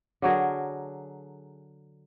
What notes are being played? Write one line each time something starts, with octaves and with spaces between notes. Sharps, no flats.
D3 F#3 G#4 A#4